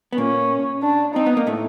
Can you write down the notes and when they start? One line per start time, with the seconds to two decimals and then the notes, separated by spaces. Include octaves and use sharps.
0.13 B3
0.17 A#2 A#3 C#4
0.82 D4
1.14 C4 D#4
1.26 B3
1.37 A#3
1.47 A2 A3